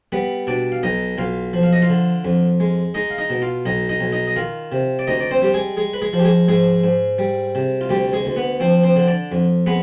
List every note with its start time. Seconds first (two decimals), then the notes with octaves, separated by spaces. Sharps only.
0.12 G3 B3 B4
0.47 B2 D4 D5
0.72 F5
0.83 B1 D#4 D#5
1.18 B1 F4 F5
1.53 F3
1.63 F5
1.73 D#5
1.82 F4 F5
1.90 D3
2.24 F2
2.60 G#3
2.94 G#3 D#4 D#5
3.10 F5
3.18 D#4 D#5
3.30 B2
3.42 F4 F5
3.66 B1 D#4 D#5
3.89 D#4 D#5
4.00 B1
4.12 D#4 D#5
4.27 D#5
4.36 D#3 F4 F5
4.72 C3
4.99 D5
5.07 D2 D#4 D#5
5.20 D5
5.31 C4 C5
5.42 G3 G4
5.54 G#3 G#4
5.77 G#3 G#4
5.93 B4
6.02 G#3 G#4
6.13 F3
6.19 G4
6.25 G#3 G#4
6.48 G#2 G#3 G#4
6.84 G#2
7.19 G3
7.55 C3
7.81 F4
7.89 D2 G3 G4
8.13 G#3 G#4
8.25 D2
8.36 B3 B4
8.60 F3 C4 C5
8.84 C4 C5
8.96 D3
9.08 D4 D5
9.32 F2
9.66 G#3 B3 B4